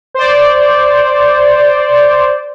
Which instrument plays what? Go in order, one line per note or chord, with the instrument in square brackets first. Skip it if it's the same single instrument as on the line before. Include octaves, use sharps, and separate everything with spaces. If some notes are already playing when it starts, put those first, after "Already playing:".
[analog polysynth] C5 D5